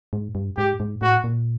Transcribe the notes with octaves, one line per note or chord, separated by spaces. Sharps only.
G#2
G2
G#2 G4
G#2
A2 F#4
A#2